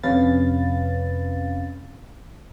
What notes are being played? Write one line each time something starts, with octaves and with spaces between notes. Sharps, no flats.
F2 C3 C#4 B4 F5 A6